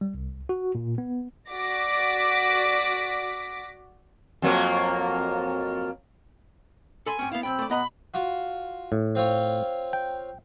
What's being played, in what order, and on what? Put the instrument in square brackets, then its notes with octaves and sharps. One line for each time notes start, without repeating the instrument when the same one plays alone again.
[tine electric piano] G3
C2
F#4
A#2
B3
[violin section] F#4 D5 D6 A#6 B6 D7
[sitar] F2 F#3 A#3
[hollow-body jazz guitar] A4 B5 C6 [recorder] G#5
[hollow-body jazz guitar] G#2 C4 C#4
[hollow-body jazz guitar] B3 E4 [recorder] F5
[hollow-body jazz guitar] B1 F2 G5 [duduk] C4 [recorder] B5
[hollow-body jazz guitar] A3 D5
[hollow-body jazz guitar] B1 D#5 A#5 [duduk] B3 [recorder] B5
[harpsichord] F4 F#4
[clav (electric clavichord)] A2
[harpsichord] C4 F4 C#5
[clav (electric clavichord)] G5